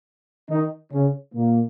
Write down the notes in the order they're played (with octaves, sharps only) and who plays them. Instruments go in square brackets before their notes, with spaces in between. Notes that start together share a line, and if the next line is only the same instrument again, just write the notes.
[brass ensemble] D#3 D#4
C#3 C#4
A#2 A#3